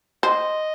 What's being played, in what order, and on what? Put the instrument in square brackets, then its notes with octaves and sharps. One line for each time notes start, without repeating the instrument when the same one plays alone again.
[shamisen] C5 [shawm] D#5